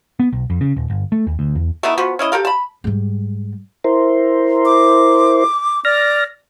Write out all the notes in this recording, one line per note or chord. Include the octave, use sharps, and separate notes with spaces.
B3
B1
F2
C#3
D#1
G1
A3
D#2
D2
E2
A3 B3 D#4 E4
F3 B3 F#4
C#4 E4 D#5
G4 A4 A#4 F5
A5 B5
G#2 G3
E4 A#4 C5
D6
D5 F6 A#6